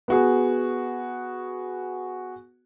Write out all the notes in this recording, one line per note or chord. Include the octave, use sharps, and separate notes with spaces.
B3 F#4 G#4